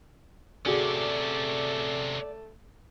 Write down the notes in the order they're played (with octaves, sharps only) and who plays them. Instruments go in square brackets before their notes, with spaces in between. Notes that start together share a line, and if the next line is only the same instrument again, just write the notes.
[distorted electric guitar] C3 C#4 [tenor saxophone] A3 [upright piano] F#4 G#4 [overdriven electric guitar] D5